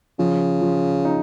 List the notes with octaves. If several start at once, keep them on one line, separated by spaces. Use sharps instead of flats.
C#3 F3
F3
D#4